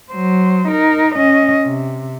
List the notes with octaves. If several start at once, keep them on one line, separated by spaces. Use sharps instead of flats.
F#3 C5
D#4 A#4
C#4 D#5
C3